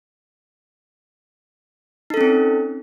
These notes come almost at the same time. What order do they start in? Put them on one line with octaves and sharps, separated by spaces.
D#4 A4 C#4 C4